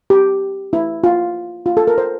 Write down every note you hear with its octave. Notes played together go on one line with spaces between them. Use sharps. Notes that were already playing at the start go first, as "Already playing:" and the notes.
G4
E4
F4
F4
A4
A#4
C5